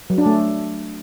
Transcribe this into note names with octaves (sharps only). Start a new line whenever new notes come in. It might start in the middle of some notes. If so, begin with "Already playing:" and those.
F#3
D4
A3